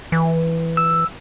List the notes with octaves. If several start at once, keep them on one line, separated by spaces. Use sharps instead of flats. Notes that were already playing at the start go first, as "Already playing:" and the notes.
E3
E6